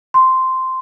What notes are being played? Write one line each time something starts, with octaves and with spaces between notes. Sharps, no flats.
C6